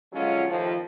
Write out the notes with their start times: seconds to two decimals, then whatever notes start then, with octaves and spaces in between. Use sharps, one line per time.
0.12 D3 F3 F#3 G#3 C#4 F4
0.48 F2 A2 C3 D#3 F3